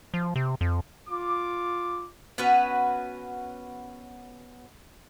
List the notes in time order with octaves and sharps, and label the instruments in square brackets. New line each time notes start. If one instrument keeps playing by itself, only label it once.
[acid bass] F3
C3
F2
[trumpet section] F4 D6
[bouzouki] B3 C#4 F#4 B4